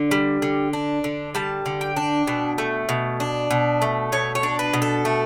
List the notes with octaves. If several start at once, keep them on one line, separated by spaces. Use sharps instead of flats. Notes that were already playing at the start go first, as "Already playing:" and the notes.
Already playing: D3
G3
D3
D4
D3
G3 A5
D3
G5
D4
B2
A3
B2
D4
B2
A3
B2 C#5
C#5
D4
B4
B2
A4
A3